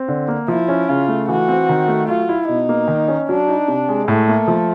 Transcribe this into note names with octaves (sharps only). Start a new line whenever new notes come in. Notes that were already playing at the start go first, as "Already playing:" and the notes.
Already playing: C4
D3
A#3
F3 E4
C#4
C#3 F4
A3
E3 F#4
C4
D#3
A3
F#3 F4
E4
B2 D#4
A#3
D#3
C#4
F#3 D4
D#4
C3
G#3
A2 A3
A#3
F3